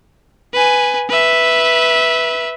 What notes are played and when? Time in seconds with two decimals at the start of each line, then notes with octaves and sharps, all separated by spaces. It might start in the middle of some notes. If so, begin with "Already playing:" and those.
0.53 B4 G#5
1.08 B4 E5